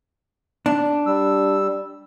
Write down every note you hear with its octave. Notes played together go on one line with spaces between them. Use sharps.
D4
G3 E6